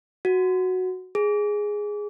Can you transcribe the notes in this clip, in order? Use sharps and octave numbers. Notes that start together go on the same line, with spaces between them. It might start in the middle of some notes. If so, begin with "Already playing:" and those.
F#4
G#4